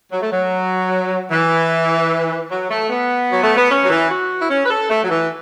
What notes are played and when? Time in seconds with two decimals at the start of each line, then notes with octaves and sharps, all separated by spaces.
0.10 F#3
0.21 A3
0.31 F#3
1.30 E3
2.50 F#3
2.70 A3
2.90 B3
3.29 F#3
3.43 A3
3.56 B3
3.70 C#4
3.82 F#3
3.90 E3
4.09 F#4
4.40 E4
4.49 C#4
4.65 B4
4.69 A4
4.89 A3
5.03 F#3
5.09 E3